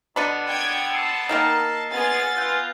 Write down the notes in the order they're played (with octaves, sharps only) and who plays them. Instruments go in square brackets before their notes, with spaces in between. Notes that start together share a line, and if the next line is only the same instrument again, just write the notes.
[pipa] B2 D4 B5 [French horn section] D3 B3 [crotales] A6 C#7 D#7
[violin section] G5 G#6
[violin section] A5 [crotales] E6 C7
[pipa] D#3 A#3 D#4 [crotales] D#6 F6 A#6
[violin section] B3 G#5 A6 [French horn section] F4 G#4
[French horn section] F4 [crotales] E6 F#6 G6